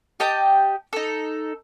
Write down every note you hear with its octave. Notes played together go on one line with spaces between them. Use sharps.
G4 D#5 G5 A5
D#4 A4